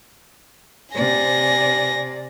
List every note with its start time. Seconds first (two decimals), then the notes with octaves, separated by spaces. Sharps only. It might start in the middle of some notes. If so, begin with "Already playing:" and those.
0.95 C3 D5 G#5 A#6